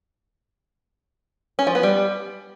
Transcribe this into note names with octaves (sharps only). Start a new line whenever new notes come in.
C#4
F3
B3
G3